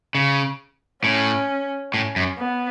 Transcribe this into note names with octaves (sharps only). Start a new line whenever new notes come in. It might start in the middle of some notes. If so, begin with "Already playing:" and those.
C#3
A2 C#4
A2 C#4
F#2
B3